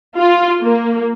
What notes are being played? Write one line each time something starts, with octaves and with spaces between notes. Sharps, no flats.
F4
A#3